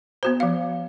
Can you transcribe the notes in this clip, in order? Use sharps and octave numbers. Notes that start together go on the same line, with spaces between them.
B3 F#4 C5
F3 F5